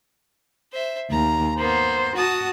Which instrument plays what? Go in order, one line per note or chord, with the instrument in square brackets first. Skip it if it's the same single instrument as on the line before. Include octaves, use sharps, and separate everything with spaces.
[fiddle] C5 E5
[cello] D#2 [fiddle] A#5
[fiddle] A#3 B3 [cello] C5
[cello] F#4 [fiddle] A5 D#6